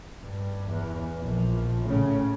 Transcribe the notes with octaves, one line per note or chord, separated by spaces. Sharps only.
G2
E2
A#1 F3
A2 C#3